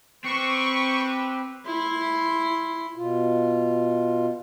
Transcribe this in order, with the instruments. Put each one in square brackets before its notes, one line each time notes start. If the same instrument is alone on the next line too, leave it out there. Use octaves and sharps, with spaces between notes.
[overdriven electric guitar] C4 [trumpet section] G4 B4 [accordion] C#6
[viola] E4 C6
[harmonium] B2 F4